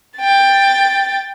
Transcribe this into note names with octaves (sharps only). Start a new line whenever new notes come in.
G5 A6